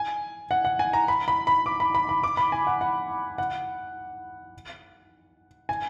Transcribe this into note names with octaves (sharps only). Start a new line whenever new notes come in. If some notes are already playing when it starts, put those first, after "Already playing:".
Already playing: G#5
F#5
F#5
G#5
A#5
B5
B5
B5
D6
B5
B5
B5
D6
B5
G#5
F#5
F#5
F#5
G#5